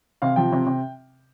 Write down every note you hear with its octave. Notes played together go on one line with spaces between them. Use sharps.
C3 F5
F3 G5
C3
C3